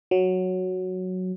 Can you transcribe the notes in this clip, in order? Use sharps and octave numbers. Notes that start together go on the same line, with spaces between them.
F#3